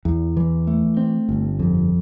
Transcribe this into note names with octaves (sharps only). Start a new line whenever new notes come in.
E2
E3
A3
C4
G1
F2